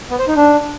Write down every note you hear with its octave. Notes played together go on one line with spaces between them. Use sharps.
B3
C5
D#4
D4